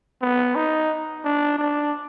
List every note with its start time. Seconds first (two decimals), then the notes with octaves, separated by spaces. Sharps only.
0.22 B3
0.56 D#4
1.25 D4
1.58 D4